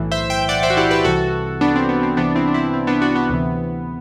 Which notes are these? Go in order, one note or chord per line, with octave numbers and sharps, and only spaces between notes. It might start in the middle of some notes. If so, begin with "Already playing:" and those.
Already playing: B1 A2 E3
C5 E5
E5 G5
D5 F#5
C5 E5
F#4
E4 G4
G4 B4
C2 C3 E3 F#4 A4
B3 D4
C4
B3
C4
C2 C3 E3 B3 D4
C4 E4
D4
C4 E4
C4
B3 D4
D4 F#4
B3
D2 C3 E3